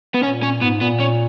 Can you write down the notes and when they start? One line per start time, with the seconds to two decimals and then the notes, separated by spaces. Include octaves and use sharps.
0.14 B3
0.23 A#2 C#4
0.43 C#4
0.61 G#2 B3
0.81 A#2 B3
1.00 C#4